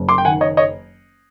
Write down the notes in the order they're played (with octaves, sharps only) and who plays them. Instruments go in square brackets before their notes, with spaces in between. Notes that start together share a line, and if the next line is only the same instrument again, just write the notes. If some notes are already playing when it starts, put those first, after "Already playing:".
Already playing: [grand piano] F#1
C6 D6
G5
D#3 F#5 G#5
C#5 D#5
C#5 D#5